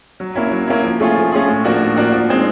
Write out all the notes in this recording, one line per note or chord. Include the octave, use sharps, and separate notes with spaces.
F#3
A#3 C#4 E4
F#3
A#3 C#4 E4
F3
A3 C#4 F4 G#4
F3
A3 C#4 F4 G#4
A2
F3 A#3 D4 F#4
A2
F3 A#3 D4 F#4
F3
G#3 C4 D#4